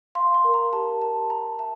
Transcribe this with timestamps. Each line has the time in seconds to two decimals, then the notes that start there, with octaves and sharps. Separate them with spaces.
0.15 F5 C6
0.34 C6
0.44 A#4
0.54 A#5
0.73 G4 A5
1.01 A#4 A5
1.30 G5 A#5
1.59 E5 A5